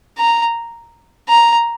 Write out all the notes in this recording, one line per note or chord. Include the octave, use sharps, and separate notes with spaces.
A#5
A#5